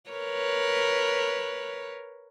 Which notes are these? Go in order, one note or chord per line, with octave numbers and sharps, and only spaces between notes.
A#4 B4 C#5